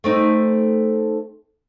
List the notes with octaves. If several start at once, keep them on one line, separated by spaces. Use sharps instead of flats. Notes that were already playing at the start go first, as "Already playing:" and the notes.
A3 C4 D#4